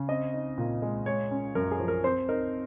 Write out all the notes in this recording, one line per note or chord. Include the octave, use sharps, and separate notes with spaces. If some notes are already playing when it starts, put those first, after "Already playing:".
Already playing: C#3
C4 D#5
D#4
A#2
G#3
G#3 C#5
C#4
F#2 A#4
G#4
F3
A#4
C4 C5
D#4 A#4